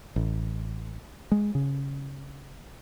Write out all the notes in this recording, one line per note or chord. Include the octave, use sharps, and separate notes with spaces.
A1
G#3
C#3